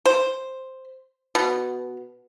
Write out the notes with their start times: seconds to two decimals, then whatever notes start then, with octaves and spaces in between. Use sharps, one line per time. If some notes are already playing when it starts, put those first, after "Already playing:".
0.06 C5
1.35 B2